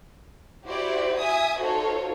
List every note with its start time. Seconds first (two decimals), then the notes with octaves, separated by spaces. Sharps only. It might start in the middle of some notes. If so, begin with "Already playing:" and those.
0.66 E4 F#4 G4 C5 D5
1.19 E5 G#5 D#6
1.58 D#4 F4 F#4 A4 C5 C#5